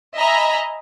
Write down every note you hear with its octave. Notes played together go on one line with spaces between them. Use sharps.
D#5 E5 G#5 A#5 B5